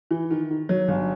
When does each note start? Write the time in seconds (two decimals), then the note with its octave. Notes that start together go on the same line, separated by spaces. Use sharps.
0.11 E3
0.31 D#3
0.51 D#3
0.69 F#3
0.89 G1